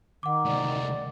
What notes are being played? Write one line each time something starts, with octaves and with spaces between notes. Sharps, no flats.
D#3 F#5 D6
D2 C3 D5